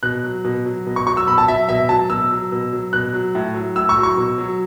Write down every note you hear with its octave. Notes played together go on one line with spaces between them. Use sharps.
B2 F#6
F#3
B2
F#3
B2
C#6
F#3 C#6
E6
B2 B5
A5
F#3 E5
B2 E5
F#3 A5
B2 E6
F#3
B2
F#3
B2 F#6
F#3
A2
F#3
A2 E6
C#6
F#3
C#6
B2
F#3